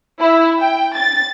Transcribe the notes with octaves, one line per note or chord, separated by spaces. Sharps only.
E4
G5
A6